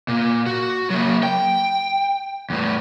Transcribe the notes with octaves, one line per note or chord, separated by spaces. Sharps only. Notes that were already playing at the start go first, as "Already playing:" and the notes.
A#2
F#4
F#3 A#3
G5
E2 A2